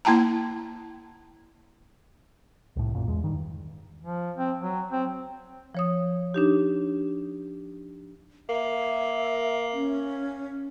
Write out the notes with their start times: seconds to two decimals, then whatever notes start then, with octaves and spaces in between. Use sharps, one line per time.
0.05 A#3 E4 G5 A5 A#5
2.76 C2 A2
2.94 A#1 F#2 A#2
3.08 E2 G#3
3.24 G2 D#3
4.04 F3
4.36 C4
4.60 F#3
4.91 C4
5.75 F3 C#5 D#6
6.34 D4 D#4 G4
8.49 A#3 E5
9.73 C#4